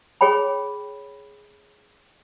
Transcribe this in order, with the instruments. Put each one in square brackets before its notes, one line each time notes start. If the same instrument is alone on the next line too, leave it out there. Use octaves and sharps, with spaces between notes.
[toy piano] G#4 C#5 G5 B5